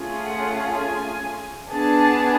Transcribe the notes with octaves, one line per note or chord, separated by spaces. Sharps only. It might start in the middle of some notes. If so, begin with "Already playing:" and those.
Already playing: A3 C#4 F4 G#4
F#5
G#5
B3 D4 G#4 A5